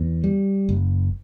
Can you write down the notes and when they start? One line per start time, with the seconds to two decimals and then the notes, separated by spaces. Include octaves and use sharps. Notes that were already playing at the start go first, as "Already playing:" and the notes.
Already playing: E2
0.24 G3
0.69 F#1